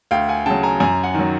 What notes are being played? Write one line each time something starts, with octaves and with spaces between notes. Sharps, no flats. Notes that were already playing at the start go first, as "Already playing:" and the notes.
D2 F5 G5
F#5 G#5
C#3 F#3 G5 A5
G#5 A#5
F#2 G#5 A#5
F#5 G#5
D#3 F#3